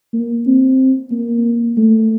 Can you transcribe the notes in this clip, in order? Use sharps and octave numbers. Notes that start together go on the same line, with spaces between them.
A#3
C4
A#3
A3